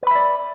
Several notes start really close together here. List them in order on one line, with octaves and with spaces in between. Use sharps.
B4 B5 E5 D5